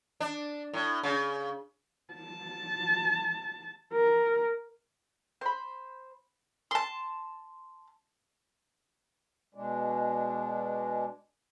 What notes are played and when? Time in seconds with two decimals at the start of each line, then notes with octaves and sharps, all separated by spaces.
0.20 D4
0.74 A2
1.03 C#3
2.14 A5
3.93 A#4
5.41 C5 B5
6.71 A5 C6
9.54 B2 G#3 D4